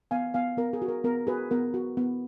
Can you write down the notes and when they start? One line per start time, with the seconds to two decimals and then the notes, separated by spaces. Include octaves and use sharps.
0.11 B3 F5 G#5
0.34 B3 F5 G#5
0.57 B3 A#4
0.73 G#4
0.82 F#4
0.88 A#4
1.04 B3 A#4
1.27 F#4 G#4 B4
1.51 B3 A#4
1.74 F#4
1.97 B3